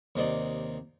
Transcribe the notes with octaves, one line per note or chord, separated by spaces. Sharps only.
D#2 C3 D#4 D5